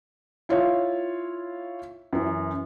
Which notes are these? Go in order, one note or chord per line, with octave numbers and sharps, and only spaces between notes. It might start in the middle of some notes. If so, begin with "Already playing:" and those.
E4 F4 C#5 F5
F#2 E3